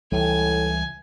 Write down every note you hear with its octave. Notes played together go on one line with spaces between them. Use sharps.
C#2 A2 E3 G3 G#5